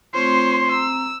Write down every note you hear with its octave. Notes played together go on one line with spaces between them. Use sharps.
A3 C4 F4 C5 C#5 C6
C4 A#5 E6